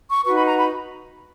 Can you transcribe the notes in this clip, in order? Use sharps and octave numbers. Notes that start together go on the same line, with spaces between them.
C#6
D#4 F#4 B4 C#6
B5
A#5
B5